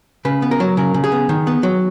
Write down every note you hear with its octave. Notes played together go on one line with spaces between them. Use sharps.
C#3 B4
B3
A#4
F#3
C#3 A#4
C#3
G#4
B3
D#3
B3
F#3